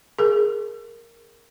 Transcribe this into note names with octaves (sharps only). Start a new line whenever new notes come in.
G#4 A#4